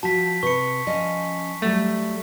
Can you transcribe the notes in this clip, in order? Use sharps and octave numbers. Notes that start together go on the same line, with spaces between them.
F3 F#4 A5 B6
C3 B4 C#6 C#7
F3 C#4 D#5
F#3 G3 A3